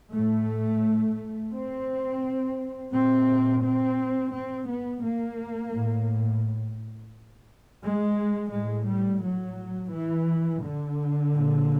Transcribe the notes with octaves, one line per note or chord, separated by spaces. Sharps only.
A2 A3
C4
A#2 C4
C4
C4
B3
A#3
A2
G#3
A2 G#3
G3
F#3
E3
D3
A#2